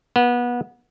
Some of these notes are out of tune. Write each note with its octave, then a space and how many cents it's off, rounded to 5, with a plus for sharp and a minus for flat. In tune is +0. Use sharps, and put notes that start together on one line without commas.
B3 -25